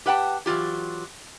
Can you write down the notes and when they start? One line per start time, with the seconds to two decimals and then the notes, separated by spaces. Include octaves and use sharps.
0.06 G4 B4 F#5 G5 A5
0.46 E3 F#3 F4 G4